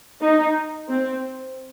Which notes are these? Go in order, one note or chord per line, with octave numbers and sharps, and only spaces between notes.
D#4
C4